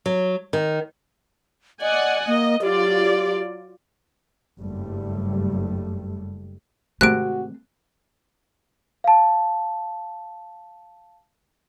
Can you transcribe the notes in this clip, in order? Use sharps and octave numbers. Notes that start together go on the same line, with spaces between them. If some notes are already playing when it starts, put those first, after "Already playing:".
F#3
D#3
D5 D#5 F#5 G#5
A#3 D#5
F#3 F4 G4 D5
F#1 G2 G3 A3
G#1 C3 A3 C4 F#4 F#6 D7
F5 A5